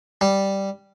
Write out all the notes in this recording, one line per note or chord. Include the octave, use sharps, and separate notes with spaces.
G3